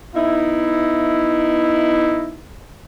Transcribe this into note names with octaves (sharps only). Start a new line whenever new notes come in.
B3 D#4 E4